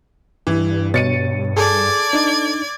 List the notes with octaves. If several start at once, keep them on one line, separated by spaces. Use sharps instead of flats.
G2 E3
B2 C#5 A6 C#7 D#7
G#4 A4 D5 G#6
D4 D#4